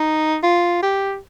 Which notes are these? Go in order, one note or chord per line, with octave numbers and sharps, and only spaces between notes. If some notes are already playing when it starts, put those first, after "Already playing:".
Already playing: D#4
F4
G4